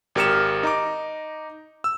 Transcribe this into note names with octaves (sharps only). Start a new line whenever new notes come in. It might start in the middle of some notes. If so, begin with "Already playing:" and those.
G#1 G4 A#4 F6 C#7 E7
D#4 A#5 D6
E6